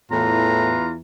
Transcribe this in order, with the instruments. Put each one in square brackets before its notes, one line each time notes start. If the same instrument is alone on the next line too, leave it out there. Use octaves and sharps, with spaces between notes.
[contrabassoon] E2 [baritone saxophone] A2 [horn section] E3 F4 [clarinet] A#5